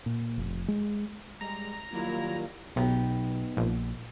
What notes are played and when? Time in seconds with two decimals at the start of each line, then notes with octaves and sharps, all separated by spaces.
0.06 A#2
0.38 F1
0.68 G#3
1.41 G3 G#3 A#5
1.92 D#3 F#3 G3 A#3 E4 F4
2.76 B1 B3 D#4 G4
3.57 A#1